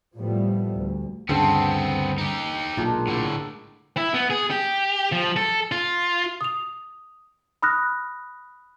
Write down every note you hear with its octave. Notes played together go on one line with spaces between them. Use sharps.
A2 F3 G3 A3 B3
D2
D2 G2 C#3 B3 C4 A4 C5 D#5
D#4 G4
B1 A#2 D#3 G#3 D4
A2 D3 D5
E4
B3
G#4
G4
F3
A4
F4
D#6 F7
B5 D#6 F6 F#6 A#6